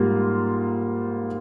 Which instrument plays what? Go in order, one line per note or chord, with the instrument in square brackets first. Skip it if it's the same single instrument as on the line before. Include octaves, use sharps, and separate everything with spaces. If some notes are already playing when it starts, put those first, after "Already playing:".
Already playing: [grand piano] G#2 G3 A#3 F4